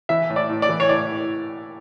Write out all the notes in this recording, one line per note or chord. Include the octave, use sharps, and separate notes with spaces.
E3 E5
A2
D5
A2
D5
E3
C#5
A2 D5